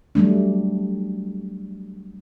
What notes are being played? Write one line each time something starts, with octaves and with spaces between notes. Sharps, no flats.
F#3 G3 A3 D4